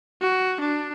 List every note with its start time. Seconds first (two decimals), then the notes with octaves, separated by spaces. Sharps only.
0.21 F#4
0.60 D4